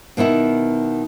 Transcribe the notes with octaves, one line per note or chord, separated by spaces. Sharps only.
B2 D#3 B3 E4